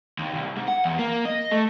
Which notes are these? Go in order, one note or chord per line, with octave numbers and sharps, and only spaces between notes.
D#2
C2
G#2
F#5
E2
A#3
D#5
A3